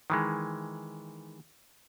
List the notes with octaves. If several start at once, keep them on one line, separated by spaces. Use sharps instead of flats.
D#3 E3 G#3